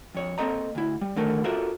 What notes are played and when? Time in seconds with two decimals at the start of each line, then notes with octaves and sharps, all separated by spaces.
0.15 F2 C#5
0.38 A#3 C4 A4 D#5 A#5
0.75 D2 E4
1.01 G3
1.16 D3 D#3 A3 A#4
1.44 F4 F#4 A4 A#4 C5 E5